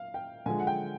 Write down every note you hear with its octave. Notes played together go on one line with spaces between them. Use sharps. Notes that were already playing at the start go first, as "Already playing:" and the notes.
Already playing: F5
G5
D3 F3 G#3 G#5
F#5
G5